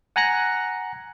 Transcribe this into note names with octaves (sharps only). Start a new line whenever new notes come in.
F#5 G#5 A#5 F#6 A#6 C#7